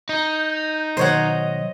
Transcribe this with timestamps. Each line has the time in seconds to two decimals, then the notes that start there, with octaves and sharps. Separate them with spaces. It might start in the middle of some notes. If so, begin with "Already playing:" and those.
0.09 D#4 G6
0.97 B2 D#3 F#3 C5 C#5 D#5 F#5